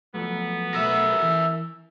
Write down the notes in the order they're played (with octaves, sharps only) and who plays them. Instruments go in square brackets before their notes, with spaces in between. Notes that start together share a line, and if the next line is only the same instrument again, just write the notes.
[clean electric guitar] F3 F#3 A3 [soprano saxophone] B3
[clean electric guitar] B1 F#3 A3 [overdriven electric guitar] A#4 E5 [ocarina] E6
[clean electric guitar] E3